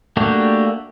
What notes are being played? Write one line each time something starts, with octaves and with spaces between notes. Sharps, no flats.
A3 A#3 D4 F#4 G4